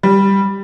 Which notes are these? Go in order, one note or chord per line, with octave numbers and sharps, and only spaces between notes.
G3